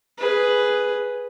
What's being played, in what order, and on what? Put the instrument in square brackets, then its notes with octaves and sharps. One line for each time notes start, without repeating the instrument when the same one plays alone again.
[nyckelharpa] G#4 B4